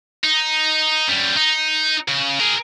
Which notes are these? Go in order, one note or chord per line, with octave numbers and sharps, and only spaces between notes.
D#4
F#2 G3
D#4
C#3
G#4 A#4